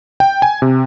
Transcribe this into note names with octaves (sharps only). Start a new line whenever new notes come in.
G5
G#5
C3